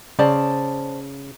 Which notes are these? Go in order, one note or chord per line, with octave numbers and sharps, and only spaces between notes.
C#3 C5 D5 A5